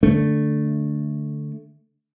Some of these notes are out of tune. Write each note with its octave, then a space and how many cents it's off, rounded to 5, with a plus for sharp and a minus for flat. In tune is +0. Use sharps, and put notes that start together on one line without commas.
D3 +0 A3 +0 D4 +0